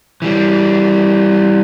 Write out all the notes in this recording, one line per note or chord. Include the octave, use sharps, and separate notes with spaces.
E3 G3